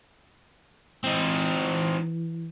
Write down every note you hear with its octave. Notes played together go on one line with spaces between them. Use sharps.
E3 C4 D#4